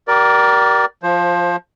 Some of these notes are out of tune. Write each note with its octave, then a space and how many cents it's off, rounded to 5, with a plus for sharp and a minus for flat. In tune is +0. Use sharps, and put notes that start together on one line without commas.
G4 -35 A#4 +15 D5 +0
F3 +0 C5 +20